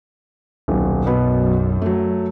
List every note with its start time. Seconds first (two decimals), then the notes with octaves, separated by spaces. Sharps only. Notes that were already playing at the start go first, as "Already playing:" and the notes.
0.68 D#1 B1
1.06 F#2 B2 B3 B5
1.82 F#3 A3